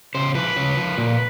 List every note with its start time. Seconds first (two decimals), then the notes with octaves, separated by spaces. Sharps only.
0.15 C#3 C5
0.34 F3 B4
0.56 C#3
0.77 F3
0.98 A#2